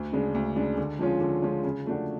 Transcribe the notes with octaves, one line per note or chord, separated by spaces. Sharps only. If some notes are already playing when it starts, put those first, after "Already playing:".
Already playing: D2
C#3 G#3 D4
D2
C#3 G#3 D4
D3
F3 G#3 C#4 F4
D3
F3 G#3 C#4 F4
C#3
F3 A3 D4 F#4